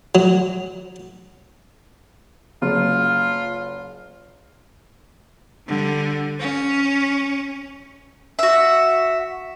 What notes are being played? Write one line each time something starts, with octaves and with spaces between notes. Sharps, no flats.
F#3
F#1 F4
D3 G3
C#4
F#4 E5